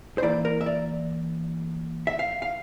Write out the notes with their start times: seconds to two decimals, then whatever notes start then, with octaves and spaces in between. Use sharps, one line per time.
0.18 C5
0.22 E3 A#3 E4 D5
0.45 A#4
0.61 E5
0.66 D5
2.07 E5
2.19 F5
2.42 F5